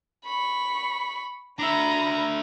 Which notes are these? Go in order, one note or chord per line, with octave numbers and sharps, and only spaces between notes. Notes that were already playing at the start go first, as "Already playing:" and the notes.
B5 C#6
D4 E5 A#5 B5